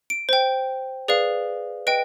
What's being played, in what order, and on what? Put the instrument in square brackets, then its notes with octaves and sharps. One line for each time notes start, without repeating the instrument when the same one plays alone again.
[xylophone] D7
C5 G5
G#4 B4 D5 F5
B4 D#5 G5 D7